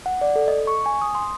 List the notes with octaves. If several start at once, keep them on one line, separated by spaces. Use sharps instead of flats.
F#5
D5
A4
D#5
C#6
G#5
D#6
C6